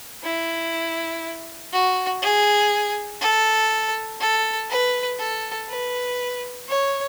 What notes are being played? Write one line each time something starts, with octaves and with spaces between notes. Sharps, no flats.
E4
F#4
G#4
A4
A4
B4
A4
B4
C#5